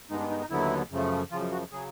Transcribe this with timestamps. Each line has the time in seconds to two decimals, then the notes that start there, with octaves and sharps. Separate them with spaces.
0.10 G2 D#3 G#3 B3 D#4
0.20 D4
0.31 D#4
0.41 D#4
0.50 D#2 D3 F#3 B3 E4
0.91 F#2 C#3 F3 A3
1.31 F#2 C#3 F3 F4
1.52 F#4
1.72 C#3 F#3 G#4